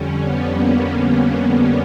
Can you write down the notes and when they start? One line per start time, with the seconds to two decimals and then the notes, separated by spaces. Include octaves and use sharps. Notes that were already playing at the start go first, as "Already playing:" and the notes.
Already playing: F2 D3 G3 C#4
0.23 B3
0.54 A#3
1.02 B3
1.48 A#3